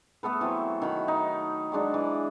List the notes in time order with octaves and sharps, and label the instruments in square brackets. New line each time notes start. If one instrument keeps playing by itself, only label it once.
[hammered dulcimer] A3 B3 A4 B4
E3 F#3 A3 C4
D#3 F#4 B5
D#4
F#3 G#3 D4
E3